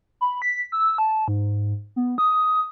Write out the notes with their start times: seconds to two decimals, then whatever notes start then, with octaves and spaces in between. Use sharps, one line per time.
0.21 B5
0.42 B6
0.72 E6
0.98 A5
1.28 G#2
1.96 B3
2.18 D#6